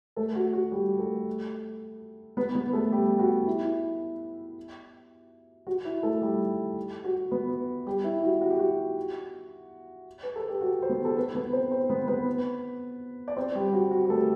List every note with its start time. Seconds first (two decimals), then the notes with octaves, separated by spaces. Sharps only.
0.16 A3 A4
0.35 F#4
0.53 F#4
0.72 G3 G4
0.99 A3 A4
2.37 B3 B4
2.55 B3 B4
2.73 A3 A4
2.91 G3 G4
3.19 F#4
3.47 E4
5.67 F#4
5.85 E4
6.03 A3 A4
6.22 G3 G4
7.04 F#4
7.31 B3 B4
7.86 G3 G4
8.04 E4
8.23 F#4
8.42 F#4
8.51 G4
8.59 F#4
10.23 B4
10.36 A4
10.49 G4
10.61 F#4
10.82 C5
10.89 B3 B4
11.05 A4
11.17 B3 B4
11.35 B3 B4
11.53 C4 C5
11.71 C4 C5
11.90 B3 B4
12.08 B3 B4
13.28 D5
13.36 C4 C5
13.55 G3 G4
13.73 F#4
13.91 F#4
14.05 G4
14.09 A3 A4